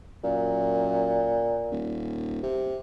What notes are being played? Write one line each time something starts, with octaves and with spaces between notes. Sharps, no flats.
F#2 A#2
D#1
C3